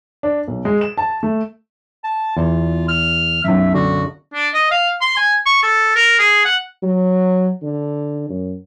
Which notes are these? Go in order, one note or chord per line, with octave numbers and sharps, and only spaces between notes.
D4
B1
G#3
E7
A5
A3
A5
E2 F4
F6
B1 F#2 E5
D3 F#4
D4
D#5
F5
C6
G#5
C#6
A4
A#4
G#4
F#5
F#3
D3
F#2